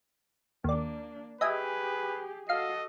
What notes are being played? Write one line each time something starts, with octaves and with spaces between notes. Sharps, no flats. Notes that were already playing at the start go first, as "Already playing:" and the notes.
D#2 A#3 D4 D5
G4 G#4 B4 D#5 E5 G#5
F#4 A4 D#5 F5 C7